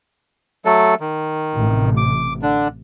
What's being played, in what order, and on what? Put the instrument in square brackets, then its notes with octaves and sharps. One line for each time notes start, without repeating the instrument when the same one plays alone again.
[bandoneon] F#3 A3 A4
D#3
[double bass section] A1 C3
[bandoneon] D6
D3 D4